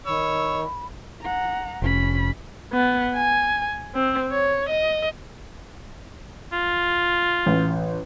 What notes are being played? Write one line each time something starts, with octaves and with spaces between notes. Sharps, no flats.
D#3 C#5 B5 E6
F#5 A#5
F1 C#4 B5
B3
G#5
C4
C#5
D#5
F4
A1